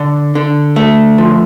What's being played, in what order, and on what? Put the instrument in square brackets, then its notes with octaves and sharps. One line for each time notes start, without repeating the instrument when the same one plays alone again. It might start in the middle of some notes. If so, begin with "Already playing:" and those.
Already playing: [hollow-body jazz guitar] D3
D3
A3
F3